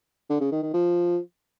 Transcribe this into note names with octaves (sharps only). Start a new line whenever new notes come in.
D3
C#3
D#3
D#3
F3